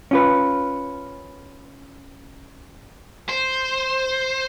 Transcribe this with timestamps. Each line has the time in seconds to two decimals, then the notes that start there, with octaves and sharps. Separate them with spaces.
0.11 C#4 F4 B4
3.29 C5